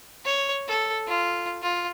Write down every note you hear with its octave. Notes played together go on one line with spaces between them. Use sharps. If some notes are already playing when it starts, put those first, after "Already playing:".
C#5
A4
F4
F4